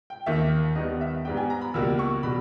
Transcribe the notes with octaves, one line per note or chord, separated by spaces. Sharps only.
G5
D#2 D#3 A#3 E5
D#2 D#3 G3 B3 D#5
E5
G#2 G3 B3 G5
G#5
A#5
B5
C#2 B2 G3 A#3 E6
C#6
B2 G3 B5